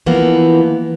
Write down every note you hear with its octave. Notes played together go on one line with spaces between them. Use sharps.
E3 F3 A#3 B3